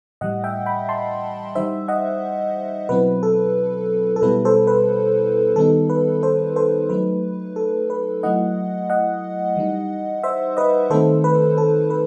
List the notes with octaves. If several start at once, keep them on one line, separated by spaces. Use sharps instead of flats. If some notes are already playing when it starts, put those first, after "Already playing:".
A2 E3 G3 D#5 F#5
E5 G5
G5 B5
A5 C6
E3 G3 D#4 C5 E5
D#5 F#5
B2 F#3 C4 E4 B4
A4
A4
B2 G3 B3 E4 B4
A4 C5
B4
D#3 G3 B3 D#4 A4
B4
A4 C5
A4 C5
F#3 A3 D#4 B4
A4
B4
F#3 A3 E4 D#5 F#5
D#5 F#5
E3 G3 D#4
C5 E5
B4 D#5
D#3 A3 C4 D#4 A4 C5
B4
A4
B4